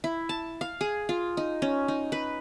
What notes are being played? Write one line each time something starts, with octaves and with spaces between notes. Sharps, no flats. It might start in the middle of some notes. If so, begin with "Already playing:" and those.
E4
A5
F5
G#4
F4
D#4
C#4
D#4
B4